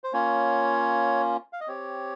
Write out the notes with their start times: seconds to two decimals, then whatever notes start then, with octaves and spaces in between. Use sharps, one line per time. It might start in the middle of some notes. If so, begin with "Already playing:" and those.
0.04 C5
0.13 A#3 C#4 F4 C#5
1.53 F5
1.61 D#5
1.67 C4 G4 C#5